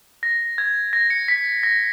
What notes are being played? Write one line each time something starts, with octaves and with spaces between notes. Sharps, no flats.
A#6
G#6
A#6
C#7
B6
A#6